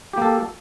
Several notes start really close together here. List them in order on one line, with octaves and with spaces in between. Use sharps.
G4 A#3 A4